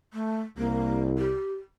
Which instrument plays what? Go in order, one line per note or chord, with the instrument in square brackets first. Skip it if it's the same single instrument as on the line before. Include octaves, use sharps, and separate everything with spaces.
[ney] A3
[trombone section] C2 [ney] A#3
[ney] G4